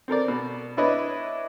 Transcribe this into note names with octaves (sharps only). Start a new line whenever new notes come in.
C4 A4 A#4 D5
B2
D4 E4 B4 C#5 D#5